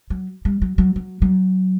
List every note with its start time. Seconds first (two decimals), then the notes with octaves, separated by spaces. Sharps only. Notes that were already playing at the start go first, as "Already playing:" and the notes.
0.10 F#3
0.45 G3
0.62 F#3
0.78 F#3
0.96 F#3
1.22 F#3